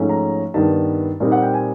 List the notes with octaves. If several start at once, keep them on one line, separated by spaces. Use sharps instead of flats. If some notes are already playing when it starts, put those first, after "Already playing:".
Already playing: G#2 F3 A3 C#4
A#5
G2 D#3 G3 B3 A5
A#2 G3 C4 D#4
F#5
G5
G#5